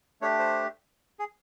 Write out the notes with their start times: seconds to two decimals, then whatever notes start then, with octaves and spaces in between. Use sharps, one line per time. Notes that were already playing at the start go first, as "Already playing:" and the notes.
0.22 A3 D4 G4 C#5
0.39 C5
1.19 G#4